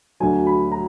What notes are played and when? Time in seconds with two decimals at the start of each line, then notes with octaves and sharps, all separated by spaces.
0.20 D2 D3 F#3 G#5
0.47 B5
0.72 A#5